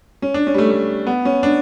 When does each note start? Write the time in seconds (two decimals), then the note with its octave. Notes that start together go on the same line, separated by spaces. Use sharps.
0.22 C#4
0.34 D4
0.47 C#4
0.54 G3
0.58 A3
0.71 A3
1.07 B3
1.25 C#4
1.43 D4